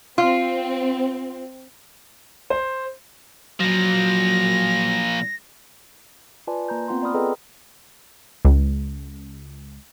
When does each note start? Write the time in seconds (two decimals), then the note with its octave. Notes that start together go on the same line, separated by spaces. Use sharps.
0.18 C4 F4
2.50 C5
3.60 A#2 F3 F#3 A#6
6.47 F4 B4 D5 G#5 A5 C6
6.69 A#3 A#5 G6
6.88 B3 C4 F4 F#5 A#5 C6
7.03 D5 B5 C6 D#6 F6
7.14 G#4 A4 B4 D#5 G5 A#5
8.45 C#2